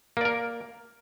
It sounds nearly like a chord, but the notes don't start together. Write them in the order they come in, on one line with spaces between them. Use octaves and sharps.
A#3 D5 A#4